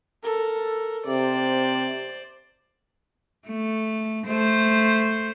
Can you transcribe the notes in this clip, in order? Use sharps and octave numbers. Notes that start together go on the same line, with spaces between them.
A4 A#4
C3 C5 D5
A3
A3 C5